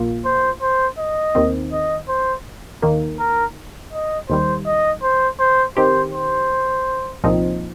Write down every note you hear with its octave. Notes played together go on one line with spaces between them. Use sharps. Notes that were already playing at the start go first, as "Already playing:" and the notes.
Already playing: A#1 A#2 A#3 F4
C5
C5
D#5
D#2 D#3 C4
D#5
C5
D#2 D#3 A#3
A#4
D#5
D#2 D#3 G3 C5
D#5
C5
C5
D#3 C4 G4 C5
C5
C2 A#2 F3 C4 D#4